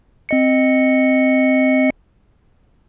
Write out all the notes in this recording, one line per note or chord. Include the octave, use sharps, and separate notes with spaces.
C4 D#5 C#7